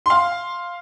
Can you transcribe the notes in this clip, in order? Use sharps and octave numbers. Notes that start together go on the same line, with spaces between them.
F5 C6